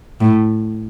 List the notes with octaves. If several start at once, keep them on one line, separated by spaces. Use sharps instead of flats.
A2